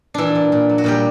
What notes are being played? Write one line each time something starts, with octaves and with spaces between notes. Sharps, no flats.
A#2 E3 D4 E4
A#2
A#2
F#3
F#4
A#2 G3 G4